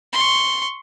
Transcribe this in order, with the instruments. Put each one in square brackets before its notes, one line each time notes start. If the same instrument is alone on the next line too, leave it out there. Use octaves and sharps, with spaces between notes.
[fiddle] C6 C#6